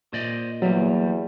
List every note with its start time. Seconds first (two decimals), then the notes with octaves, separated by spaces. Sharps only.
0.13 A#2 C5 D5 D#5
0.62 E2 F#3 G3 A#3